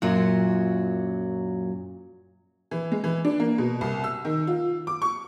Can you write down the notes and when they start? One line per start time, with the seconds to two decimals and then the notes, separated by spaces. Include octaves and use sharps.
0.02 F#2 A#2 F#3 F4
2.71 E3
2.92 G#3
3.04 E3
3.25 D4
3.40 A#3
3.58 B2
3.81 C2
4.04 E6
4.25 D#3
4.47 F4
4.87 D6
5.02 C#6